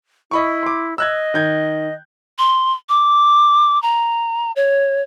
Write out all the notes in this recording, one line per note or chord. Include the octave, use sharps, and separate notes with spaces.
E4 D#5 B5 C#6
C6 D6
D#5 E6 F#6 G#6
D#3 G6 G#6
C6
D6
A#5
C#5